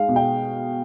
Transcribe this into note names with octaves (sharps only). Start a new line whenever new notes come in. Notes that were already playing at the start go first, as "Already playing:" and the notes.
Already playing: G#3 D#4 F5
B2
G5